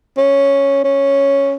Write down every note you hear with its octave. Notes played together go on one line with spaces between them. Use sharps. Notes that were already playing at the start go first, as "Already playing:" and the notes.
C#4
C#4